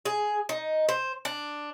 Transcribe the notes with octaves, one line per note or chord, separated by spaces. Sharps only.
G#4
D#4
C5
D4